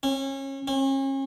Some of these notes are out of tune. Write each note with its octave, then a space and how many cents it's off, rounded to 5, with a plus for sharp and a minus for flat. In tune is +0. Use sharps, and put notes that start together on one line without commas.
C#4 -30
C#4 -40